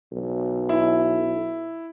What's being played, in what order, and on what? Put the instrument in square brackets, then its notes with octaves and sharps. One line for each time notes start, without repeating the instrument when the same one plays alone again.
[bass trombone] B1
[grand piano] E4